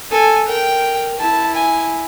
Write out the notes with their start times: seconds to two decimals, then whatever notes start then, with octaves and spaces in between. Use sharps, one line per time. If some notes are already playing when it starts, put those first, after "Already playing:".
0.11 A4 G#5
0.47 A#4 G5
1.20 E4 A5
1.55 G#5